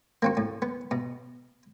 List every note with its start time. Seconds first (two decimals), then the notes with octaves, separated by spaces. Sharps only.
0.22 A#3 C4 F#4
0.37 A2
0.62 B3
0.91 B2